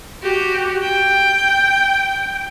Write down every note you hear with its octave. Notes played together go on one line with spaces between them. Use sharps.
F#4 G4
G5